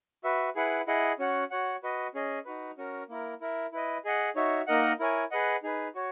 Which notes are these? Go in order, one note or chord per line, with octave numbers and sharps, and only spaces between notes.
F#4 B4 E5
E4 G#4 B4 F#5
E4 G#4 D#5 F#5
C#4 F#4 C#5 F#5
F#4 C#5 F#5
F#4 B4 D#5
C#4 G#4 D#5
D#4 F#4 B4
C#4 F#4 A#4
A#3 E4 A#4
E4 A#4 E5
E4 B4 D#5
G#4 D#5 F#5
D#4 F#4 C#5 E5
A#3 D#4 A#4 D#5 F#5
E4 A#4 C#5 G#5
G#4 B4 D#5 F#5
D#4 G#4 B4
F#4 C#5